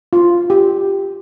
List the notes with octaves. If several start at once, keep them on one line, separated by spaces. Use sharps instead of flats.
F4
G4